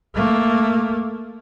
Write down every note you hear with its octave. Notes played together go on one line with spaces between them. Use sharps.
A3 A#3